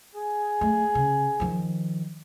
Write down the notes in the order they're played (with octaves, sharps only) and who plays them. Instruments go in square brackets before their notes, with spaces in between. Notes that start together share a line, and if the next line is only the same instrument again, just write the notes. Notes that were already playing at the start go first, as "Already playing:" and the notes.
[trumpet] G#4
[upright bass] A3
C#3
D#3 F3